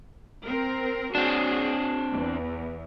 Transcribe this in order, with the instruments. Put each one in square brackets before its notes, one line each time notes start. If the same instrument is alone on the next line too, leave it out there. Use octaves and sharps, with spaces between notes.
[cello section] C4 A#4
[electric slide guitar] C4 D4 [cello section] F#4 G#4
[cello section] E2